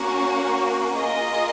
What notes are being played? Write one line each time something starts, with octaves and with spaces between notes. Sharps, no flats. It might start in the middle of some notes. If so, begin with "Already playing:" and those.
Already playing: A#3 C#4 F#4
A#3 F4 G#4 D#5